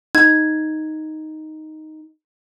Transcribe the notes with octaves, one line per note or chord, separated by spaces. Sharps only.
D#4 G#6